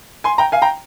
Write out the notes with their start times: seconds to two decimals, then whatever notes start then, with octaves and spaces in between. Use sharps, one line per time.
0.24 G#5 C6
0.38 G5 A#5
0.52 F5 G#5
0.62 G5 A#5